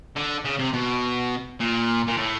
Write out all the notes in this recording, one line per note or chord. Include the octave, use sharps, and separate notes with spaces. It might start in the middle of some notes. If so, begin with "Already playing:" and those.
D3
C#3
C3
B2
A#2
A#2
A2